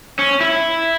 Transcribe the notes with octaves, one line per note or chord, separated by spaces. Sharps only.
C#4
E4